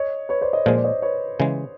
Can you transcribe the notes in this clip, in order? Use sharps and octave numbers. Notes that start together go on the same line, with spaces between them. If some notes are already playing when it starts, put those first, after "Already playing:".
Already playing: C#5 D#5
B4 C#5
C5 D5
C#5 D#5
A#2 F3 G#3 C5 D5
D5
C#5 D#5
B4 C#5
C#3 E3 G#3